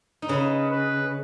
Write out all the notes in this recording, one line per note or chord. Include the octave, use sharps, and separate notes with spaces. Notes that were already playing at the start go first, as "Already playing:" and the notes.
D#4
C#3 C#4 B4
B4